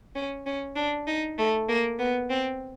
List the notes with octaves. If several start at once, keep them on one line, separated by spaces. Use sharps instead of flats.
C#4
C#4
D4
D#4
A3
A#3
B3
C4